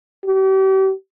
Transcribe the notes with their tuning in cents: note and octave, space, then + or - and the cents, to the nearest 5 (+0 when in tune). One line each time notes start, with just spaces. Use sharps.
G4 -40